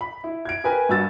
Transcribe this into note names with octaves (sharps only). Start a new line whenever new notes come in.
B5
E4
G#6 D7
G4 A#4 B4 G#5
G2 F#4 E6 A6